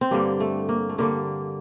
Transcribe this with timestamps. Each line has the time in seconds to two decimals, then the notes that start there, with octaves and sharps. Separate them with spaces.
0.01 C4
0.11 G2 D3 G3 A#3
0.40 A3
0.69 A#3
0.89 A3
0.98 G2 D3 G3 A#3